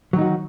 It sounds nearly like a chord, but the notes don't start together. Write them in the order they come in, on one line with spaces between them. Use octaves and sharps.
F#3 D#3 D#4 F#4